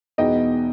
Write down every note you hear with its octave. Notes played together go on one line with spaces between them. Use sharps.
E2 B2 G#3 B3 D#4 D#5 G5